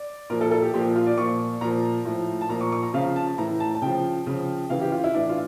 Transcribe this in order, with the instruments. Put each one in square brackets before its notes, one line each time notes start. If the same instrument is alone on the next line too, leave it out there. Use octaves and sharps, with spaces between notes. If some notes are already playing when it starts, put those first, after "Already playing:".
Already playing: [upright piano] D5
A#2 F3 A#4
A4
A4
G4
A#2 F3 G4
F4
D5
A#2 F3 C#6
A#2 F3 A#5
A2 F3
A5
A#2 F3 A#5
C#6
C#6
A#5
C#3 F3 F5
A5
A2 E3 A#5
A5
A5
C#3 F3 G5
C#3 F3
C#3 E3 F5
G4
F4
E4
A2 E3 D4
F4